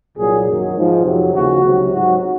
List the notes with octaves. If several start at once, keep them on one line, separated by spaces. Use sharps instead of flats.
C2 A#2 F#3 G#4
F#2 D#3 F#3
G#2 F3
F2 C3 F#3
D#2 C#3 F3 F#4
C#2 C3 F#3
G#2 F#3 F#4